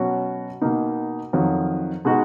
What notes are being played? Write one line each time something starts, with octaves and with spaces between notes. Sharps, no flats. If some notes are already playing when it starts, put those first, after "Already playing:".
Already playing: B2 F#3 C#4 F#4
B2 A#3 D#4
F2 D#3 F#3
B2 G#3 D#4 F#4